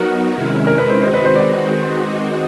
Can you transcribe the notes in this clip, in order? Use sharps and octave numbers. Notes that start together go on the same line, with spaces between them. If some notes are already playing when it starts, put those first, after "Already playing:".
Already playing: F#3 B3 D#4 F#4 A#4
C3 D#3 G#3 C#4 E4
A#4
B4
C5
D#3 G#3 C4 D#4 F#4 C5
B4
C5
D5